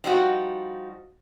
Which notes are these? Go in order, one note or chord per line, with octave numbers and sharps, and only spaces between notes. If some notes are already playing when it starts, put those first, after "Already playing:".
F3 G3 D#4 F#4